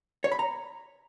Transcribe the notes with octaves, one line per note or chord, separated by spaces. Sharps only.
C#5
B5
A#5